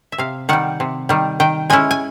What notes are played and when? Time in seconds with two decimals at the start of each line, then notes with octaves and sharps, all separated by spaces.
0.12 E5
0.18 C3 F5
0.49 D#3 G3 F#5
0.80 C3
1.09 D#3 G3
1.40 D#3 G5
1.70 G#3 C#4 E4 G#5
1.91 G#5